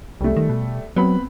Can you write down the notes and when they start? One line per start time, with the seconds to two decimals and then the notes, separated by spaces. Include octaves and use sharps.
0.21 C2 G3 A3
0.36 D#3
0.49 B2
0.96 F#3 B3 C4 B5